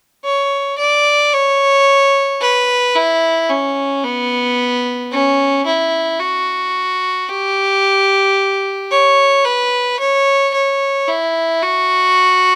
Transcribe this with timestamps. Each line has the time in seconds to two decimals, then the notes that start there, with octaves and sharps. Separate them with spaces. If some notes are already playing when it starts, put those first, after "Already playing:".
0.24 C#5
0.78 D5
1.33 C#5
2.41 B4
2.95 E4
3.49 C#4
4.04 B3
5.11 C#4
5.66 E4
6.19 F#4
7.29 G4
8.91 C#5
9.45 B4
9.99 C#5
10.54 C#5
11.08 E4
11.62 F#4